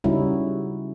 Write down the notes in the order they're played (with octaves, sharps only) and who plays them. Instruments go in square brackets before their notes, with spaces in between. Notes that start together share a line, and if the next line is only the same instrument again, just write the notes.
[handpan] C#3 G3 C#4 D#4 E4 F#4